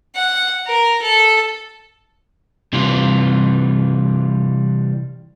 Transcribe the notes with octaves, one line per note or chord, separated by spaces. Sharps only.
F#5
A#4
A4
C3 E3 G3 F4